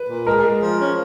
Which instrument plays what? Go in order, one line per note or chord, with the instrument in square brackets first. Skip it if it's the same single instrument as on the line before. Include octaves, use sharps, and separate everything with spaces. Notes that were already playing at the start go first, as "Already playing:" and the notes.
Already playing: [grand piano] B4
[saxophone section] A#2
[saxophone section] G#3 [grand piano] A#4
[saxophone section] G#3
F3
C#4